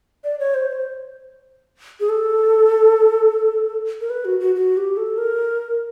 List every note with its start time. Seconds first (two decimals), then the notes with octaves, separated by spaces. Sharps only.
0.24 D5
0.39 C#5
0.55 C5
0.69 C5
2.00 G#4
2.09 A4
4.01 A#4
4.10 B4
4.25 F#4
4.40 F#4
4.55 F#4
4.77 G4
4.97 A4
5.18 A#4